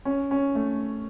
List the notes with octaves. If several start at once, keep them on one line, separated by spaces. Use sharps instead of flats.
C#4
C#4
A3